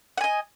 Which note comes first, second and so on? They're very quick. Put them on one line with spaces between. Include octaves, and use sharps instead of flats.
F#5 G#5 D#5